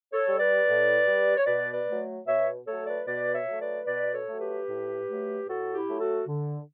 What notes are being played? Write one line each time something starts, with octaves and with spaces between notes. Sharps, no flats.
A4 C#5
G3
B4 D5
A2
G3
C#5
B2 B4 D5
B4 D5
F#3 A3
B2 C#5 E5
F#3 A3 A4 C#5
B4 D5
B2 B4 D5
C#5 E5
F#3 A3
B4 D5
B2 B4 D5
A4 C#5
F#3 A3
G4 B4
A2
F#3 A3
A2 F#4 A4
E4 G4
F#3 A3
F#4 A4
D3